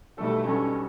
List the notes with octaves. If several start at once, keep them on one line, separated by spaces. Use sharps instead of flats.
B1 B2 G3 A3 D4 A4
B1 B2 G3 C#4 D4 A4